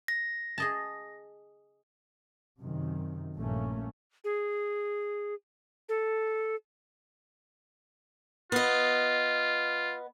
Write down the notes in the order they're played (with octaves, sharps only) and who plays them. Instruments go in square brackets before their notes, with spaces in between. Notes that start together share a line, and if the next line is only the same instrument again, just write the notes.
[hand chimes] A#6
[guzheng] G#4 D#5 A5
[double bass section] F#2 C3 D#3
A#1 G2 A3 A#3 C#4
[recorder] G#4
A4
[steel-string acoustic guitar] B3 D#5 [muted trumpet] F4